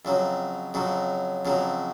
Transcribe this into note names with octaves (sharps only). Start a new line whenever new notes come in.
F2 C#3 F#3
F2 C#3 F#3
F2 C#3 F#3